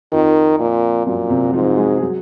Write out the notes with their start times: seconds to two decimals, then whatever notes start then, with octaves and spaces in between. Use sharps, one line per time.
0.12 F2 D#3 F3
0.60 A#2
1.06 F#2 A#2 F#3
1.29 C3 C4
1.44 F#4
1.53 G#2 F3 F4
1.72 F#4
1.77 G#3 G#4
1.97 G#4
2.01 F#3 F#4